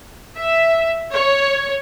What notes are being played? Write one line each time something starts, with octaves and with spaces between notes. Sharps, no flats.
E5
C#5